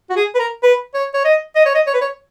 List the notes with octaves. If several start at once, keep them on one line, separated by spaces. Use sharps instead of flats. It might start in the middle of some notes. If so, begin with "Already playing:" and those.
F#4
G#4
B4
A#4
B4
C#5
C#5
D#5
D#5
C#5
D#5
C#5
B4
C#5